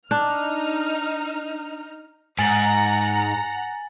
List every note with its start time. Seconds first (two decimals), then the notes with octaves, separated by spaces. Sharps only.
0.11 D4 D#4 F6
2.39 G#2 F#5 G#5 A#5 A6 F#7